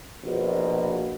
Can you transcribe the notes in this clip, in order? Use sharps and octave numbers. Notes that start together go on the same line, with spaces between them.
A#1 B2